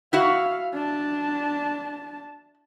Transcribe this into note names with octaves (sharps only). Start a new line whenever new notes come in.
E4 F#4 E5 F5
D4 A5